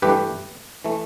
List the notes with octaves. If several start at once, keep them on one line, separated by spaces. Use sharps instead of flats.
G2 E3 A3 G4 B4
E3 A3